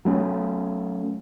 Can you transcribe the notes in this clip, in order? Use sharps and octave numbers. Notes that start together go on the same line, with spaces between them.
F#3 A3 C#4